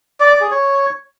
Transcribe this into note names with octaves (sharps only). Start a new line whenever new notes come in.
D5
D5
G#4
C#5